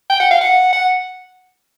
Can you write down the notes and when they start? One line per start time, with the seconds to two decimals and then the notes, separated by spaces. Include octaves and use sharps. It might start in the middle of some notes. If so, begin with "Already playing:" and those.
0.10 G5
0.20 F#5
0.31 F5
0.41 F#5
0.73 F#5